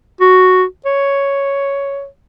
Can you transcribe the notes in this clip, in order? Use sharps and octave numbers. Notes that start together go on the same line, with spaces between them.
F#4
C#5